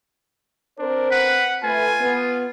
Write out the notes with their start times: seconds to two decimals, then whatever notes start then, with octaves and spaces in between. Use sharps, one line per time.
0.79 C4 D4 A#4 C5
1.11 B4 F#5
1.63 A3 F4 B4 G#5
2.01 B3